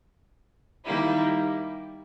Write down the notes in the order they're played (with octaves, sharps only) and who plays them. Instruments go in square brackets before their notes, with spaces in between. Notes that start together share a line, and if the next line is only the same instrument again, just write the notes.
[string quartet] D#3 G3 A#3 E4